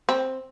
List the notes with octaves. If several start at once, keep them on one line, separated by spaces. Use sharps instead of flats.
C4